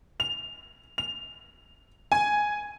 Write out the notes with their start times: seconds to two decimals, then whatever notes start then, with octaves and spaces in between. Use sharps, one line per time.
0.20 F7
0.98 F7
2.12 G#5